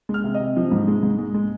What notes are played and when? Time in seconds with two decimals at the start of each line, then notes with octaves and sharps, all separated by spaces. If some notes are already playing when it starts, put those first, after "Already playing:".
0.09 G#3
0.14 F6
0.24 C3
0.34 D#5
0.40 C3
0.57 F3
0.71 G#2
0.88 G#3
1.03 G#2
1.18 G#3
1.34 G#3